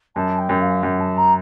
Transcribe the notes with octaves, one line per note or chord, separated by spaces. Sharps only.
F#2 A5
G5
F#2
F5
F#2 F#5
A5
A#5